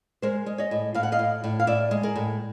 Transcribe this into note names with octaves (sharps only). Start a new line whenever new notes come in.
G#3 A#4 C5
G#3
C#5 D#5
A2
A2 F5
F#5
D#5 F5
A2
A2
F5
A2 D5 E5
G#3
G#4 A#4
A2